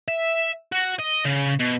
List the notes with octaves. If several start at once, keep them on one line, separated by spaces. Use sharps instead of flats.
E5
F#4
D#5
C#3
B2